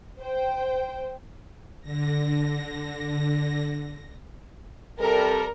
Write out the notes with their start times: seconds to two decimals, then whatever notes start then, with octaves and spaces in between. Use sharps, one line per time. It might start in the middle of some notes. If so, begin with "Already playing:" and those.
0.20 C5 G5
1.82 D3 A#6
5.00 C3 G3 A4 A#4